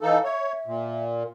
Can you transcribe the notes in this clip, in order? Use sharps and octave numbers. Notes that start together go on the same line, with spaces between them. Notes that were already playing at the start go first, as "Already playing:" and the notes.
E3 D#4 A4 F5
C#5 E5
A#2